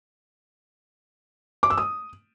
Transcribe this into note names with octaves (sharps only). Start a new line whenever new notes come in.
D6
E6
D#6